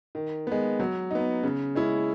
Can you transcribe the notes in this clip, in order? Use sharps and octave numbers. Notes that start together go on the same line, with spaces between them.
D#3
G#3 B3
F#3
B3 D#4
C#3
G#3 C#4 E4